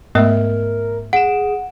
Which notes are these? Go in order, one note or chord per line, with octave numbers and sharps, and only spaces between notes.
G#2 A3 B3 A#4 D#5 E5
G#4 F#5 D7 E7